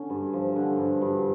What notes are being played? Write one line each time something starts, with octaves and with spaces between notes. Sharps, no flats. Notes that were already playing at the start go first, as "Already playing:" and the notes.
Already playing: D3 C#4
G2
F3
D3
G2
G2